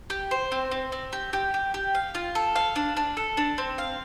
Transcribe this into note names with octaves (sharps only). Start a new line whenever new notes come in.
G4
C5
C4
C4
C4
G4
G4
G4
G4
F5
F4
A4
F5
D4
D4
A4
D4
C4
F5